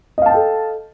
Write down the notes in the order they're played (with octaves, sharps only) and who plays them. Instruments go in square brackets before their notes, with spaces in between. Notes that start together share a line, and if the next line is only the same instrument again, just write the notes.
[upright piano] D#5
F5
A5
G5
A4